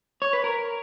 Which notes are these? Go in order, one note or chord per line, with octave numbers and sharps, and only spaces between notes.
C#5
B4
A#4